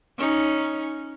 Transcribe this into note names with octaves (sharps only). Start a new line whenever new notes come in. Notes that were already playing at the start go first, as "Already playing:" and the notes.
C#4 D#4